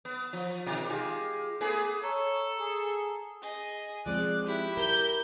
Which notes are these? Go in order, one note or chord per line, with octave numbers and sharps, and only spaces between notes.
B3
F3
B2 D#3
G#3 F4 G4
A3 B3 G#4
A4 C#5 A#5
G#4
G#4 D#5
F3 G#3 C4 D5 F#6
E4 G4
A#4 G6